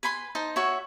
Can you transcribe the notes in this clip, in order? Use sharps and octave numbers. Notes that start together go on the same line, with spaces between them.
B4 G#5 B5 C6
D#4 C5 A5
F#4 C#5 E5